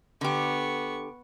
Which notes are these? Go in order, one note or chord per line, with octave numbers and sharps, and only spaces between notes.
D3 B3 G4 C#6